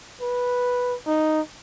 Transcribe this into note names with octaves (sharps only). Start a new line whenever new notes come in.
B4
D#4